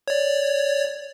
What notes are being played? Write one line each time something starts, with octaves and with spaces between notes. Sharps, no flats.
C#5 D5